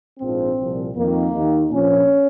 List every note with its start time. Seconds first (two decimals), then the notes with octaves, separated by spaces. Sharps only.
0.19 A#1 G#2 F3 C4
0.57 C2 A#2 F3
0.95 F2 D#3 A#3
1.33 D#2 D#3
1.71 A#1 A#2 F3 C#4